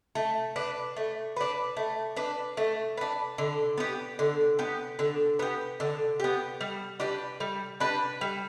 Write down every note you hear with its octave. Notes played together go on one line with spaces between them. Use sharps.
A3
D4 B4
A3
D4 B4
A3
D4 B4
A3
D4 B4
D3
B3 G4
D3
B3 G4
D3
B3 G4
D3
B3 G4
G3
D4 G4 B4
G3
D4 G4 B4
G3